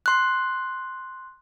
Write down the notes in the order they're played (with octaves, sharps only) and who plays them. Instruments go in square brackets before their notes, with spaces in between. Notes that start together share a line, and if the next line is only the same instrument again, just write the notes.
[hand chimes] C6 F#6